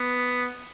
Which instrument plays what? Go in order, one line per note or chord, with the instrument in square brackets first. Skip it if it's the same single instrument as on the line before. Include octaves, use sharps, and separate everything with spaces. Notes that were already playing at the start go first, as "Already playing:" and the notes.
Already playing: [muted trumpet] B3